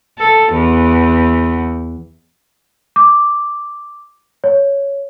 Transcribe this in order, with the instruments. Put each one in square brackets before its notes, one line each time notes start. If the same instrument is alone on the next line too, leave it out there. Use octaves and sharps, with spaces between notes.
[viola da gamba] A4
E2
[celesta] D6
C#5